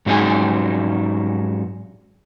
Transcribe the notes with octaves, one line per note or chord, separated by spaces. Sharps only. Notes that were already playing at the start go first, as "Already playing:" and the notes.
G#2 F#3 C#4 D#4 G#4 G#5